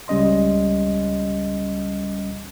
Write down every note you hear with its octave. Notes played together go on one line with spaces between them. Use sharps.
C#2 G3 C#4 D#5 C6